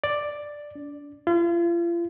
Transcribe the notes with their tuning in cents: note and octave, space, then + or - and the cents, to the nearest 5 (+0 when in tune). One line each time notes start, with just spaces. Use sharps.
D5 +5
D4 -30
F4 -40